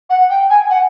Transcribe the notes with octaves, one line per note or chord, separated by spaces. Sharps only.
F#5
G5
G#5
F#5